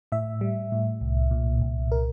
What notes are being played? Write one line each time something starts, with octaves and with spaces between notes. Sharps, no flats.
A2 E5
G3
A2
C2
A#2
C2
A#4